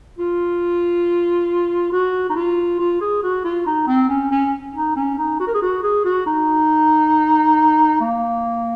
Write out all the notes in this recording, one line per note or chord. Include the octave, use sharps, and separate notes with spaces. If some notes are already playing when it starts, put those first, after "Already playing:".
F4
F#4
D#4
F4
F4
G#4
F#4
F4
D#4
C4
C#4
C#4
D#4
C#4
D#4
F#4
A#4
G#4
F#4
G#4
F#4
D#4
A#3